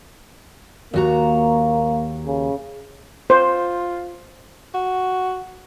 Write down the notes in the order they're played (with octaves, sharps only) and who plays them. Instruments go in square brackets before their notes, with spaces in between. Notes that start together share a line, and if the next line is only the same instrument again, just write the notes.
[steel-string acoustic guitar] D#2 F#4 A#5 [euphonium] A#3
[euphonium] C#3
[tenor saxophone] F4 [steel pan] C5
[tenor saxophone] F#4